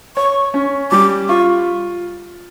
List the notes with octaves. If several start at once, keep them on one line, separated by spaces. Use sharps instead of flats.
C#5 C#6
C#4
G3 D6
F4 C#6